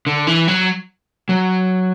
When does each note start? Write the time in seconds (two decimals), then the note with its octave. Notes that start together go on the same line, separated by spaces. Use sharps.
0.07 D3
0.27 E3
0.48 F#3
1.29 F#3